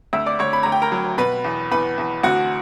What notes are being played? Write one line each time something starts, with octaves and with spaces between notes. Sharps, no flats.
D2 E5 E6
D5 D6
D2 C#5 C#6
B5
D2 A#5
G5
A#4 A#5
F#3
B2 B4 B5
E2
E2 B4 B5
E2
D2 F#4 F#5